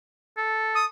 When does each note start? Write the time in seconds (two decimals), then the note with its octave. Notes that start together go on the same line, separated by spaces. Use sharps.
0.37 A4
0.75 D#6